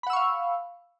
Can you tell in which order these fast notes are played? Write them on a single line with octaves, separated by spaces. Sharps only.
B5 F#5 E6 C#6 F5